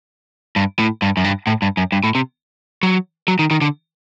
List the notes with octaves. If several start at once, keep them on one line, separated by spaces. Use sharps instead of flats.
G2
A2
G2
F#2
G2
A2
G2
F#2
G2
A2
C3
F#3
F#3
D#3
D#3
D3